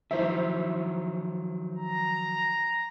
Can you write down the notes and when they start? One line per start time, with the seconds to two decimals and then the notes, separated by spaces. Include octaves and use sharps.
0.11 D#3 F3 F#3 E4 C5 E5
1.77 A#5